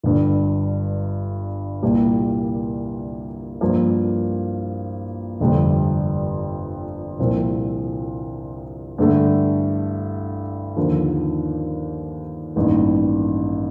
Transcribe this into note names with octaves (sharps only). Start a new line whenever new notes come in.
G1 G2 D3
C2 A#2 G3 A#3
G2 F3 A#3
G1 F2 C3 G3
C2 A#2 F3 C4
G2 D3 A3
D#2 D3 F3
A1 G2 D#3 A#3